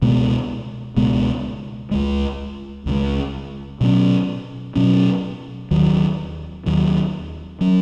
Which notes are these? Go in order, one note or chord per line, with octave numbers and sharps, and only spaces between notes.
C#2 B2 G#3 B3
C#2 B2 G#3 B3
C#2 C#3 G#3
C#2 C#3 G#3
B2 F#3 C#4
B2 F#3 C#4
D#2 D#3 F#3
D#2 D#3 F#3
F#3 C#4